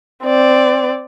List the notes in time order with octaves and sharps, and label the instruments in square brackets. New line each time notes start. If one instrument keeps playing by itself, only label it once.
[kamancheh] C4 D5